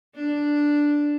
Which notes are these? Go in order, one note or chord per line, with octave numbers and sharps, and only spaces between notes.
D4